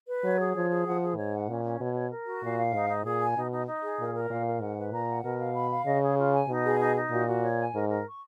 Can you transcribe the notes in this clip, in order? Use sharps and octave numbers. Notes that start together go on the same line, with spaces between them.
B4
F#3 C#5
G#4
F3 C#5
G#4
F3 F#5
G#4
G#2 C#5
F#5
A#2 C#4
C#4
B2 C#5
C#5
A#4
F#4
A#2 F5
F5
G#2 D#4
D#4
A#2 G#4
G#5
B2 D#4
D#4
D#4
G#4
A#2 A#4
A#4
A#2 F5
A#4
G#2 F#5
B4
A#2 A#5
F#5
B2 A#4
F5
B5
F5
C#3 D#5
G#4
F4
G#5
B2 D#4
G#4
D#4
D#4
A#2 F#4
F#4
C#5
G#5
G#2 A#4
A#4
C#6